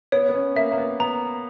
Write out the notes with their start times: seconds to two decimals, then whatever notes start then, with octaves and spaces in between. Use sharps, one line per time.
0.12 B3 C#5
0.29 B3
0.34 C#4
0.56 A#3 E5
0.72 A#3
0.78 B3
1.00 B3 A#5